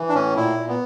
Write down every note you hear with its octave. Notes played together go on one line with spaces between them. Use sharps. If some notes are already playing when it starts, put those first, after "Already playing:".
Already playing: E3
D4
A2 C#4
A#2 E4
A#2
B3